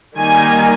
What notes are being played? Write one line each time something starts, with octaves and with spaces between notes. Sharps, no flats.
D#3 G3 A#3 D#4 G#5